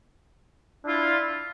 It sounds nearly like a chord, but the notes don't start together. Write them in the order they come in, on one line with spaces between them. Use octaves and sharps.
D4 E4 F4